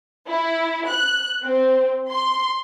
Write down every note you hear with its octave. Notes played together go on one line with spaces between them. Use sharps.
E4
F#6
C4
C6